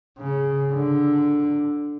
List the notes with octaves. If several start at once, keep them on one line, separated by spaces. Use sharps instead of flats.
C#3
D3